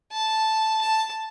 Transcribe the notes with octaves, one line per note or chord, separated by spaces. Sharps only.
A5
A5